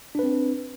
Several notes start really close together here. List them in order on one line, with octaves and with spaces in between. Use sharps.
D4 B4 C4